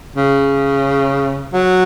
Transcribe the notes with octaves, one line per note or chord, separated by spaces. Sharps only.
C#3
F#3